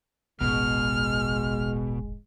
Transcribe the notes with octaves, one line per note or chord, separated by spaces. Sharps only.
E1 A1 B2 G#3 F6